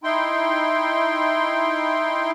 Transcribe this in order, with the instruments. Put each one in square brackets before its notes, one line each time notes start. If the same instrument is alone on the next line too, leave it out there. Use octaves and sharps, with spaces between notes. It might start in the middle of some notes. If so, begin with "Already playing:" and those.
[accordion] D#4 E4 G5 C6